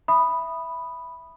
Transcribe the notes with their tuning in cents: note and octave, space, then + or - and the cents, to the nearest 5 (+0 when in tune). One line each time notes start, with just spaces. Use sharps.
E5 +0 B5 +0 D#6 -15